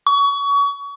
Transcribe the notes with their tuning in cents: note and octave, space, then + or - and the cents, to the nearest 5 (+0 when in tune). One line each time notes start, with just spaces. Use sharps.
C#6 +30